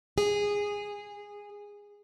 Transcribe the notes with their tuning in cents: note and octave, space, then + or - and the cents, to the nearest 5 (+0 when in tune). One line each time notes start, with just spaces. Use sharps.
G#4 -15